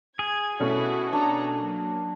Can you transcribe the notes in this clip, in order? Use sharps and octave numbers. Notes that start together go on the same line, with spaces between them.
G#4 G#6
B2 E3 A3 C#4 E4 F#4
D4 A4 C#5 A#5
F#3 A#3